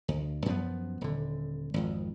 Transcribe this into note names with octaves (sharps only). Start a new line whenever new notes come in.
D2
F#2 F3 B3
D#1 D3
G#1 F2